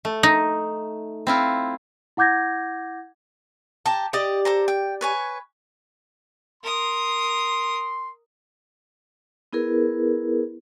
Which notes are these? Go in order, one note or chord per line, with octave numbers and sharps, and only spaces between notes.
A3
D#4
C4 E4 F4
E4 F#5 D6 G6 G#6 A#6
G4 A5 A#5
G4 D5 D#5
A4 C5 A#5
G5
B4 C#5 G#5
A#4 C6 D#6
B3 E4 G#4 A#4 B4